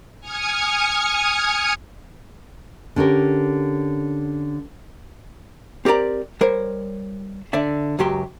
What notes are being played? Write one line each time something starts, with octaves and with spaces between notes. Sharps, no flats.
G#5 D#6 F6 G#6 C#7
D3 C#4 G4 A#4
C4 G4 A#4 D5 A#5
G3 A#4 C5 C#5
D3 D5 E5
C#2 F#2 F#3 G4 C6